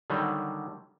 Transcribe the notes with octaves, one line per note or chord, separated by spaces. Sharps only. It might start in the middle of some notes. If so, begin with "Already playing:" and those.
D3 D#3 F#3 G3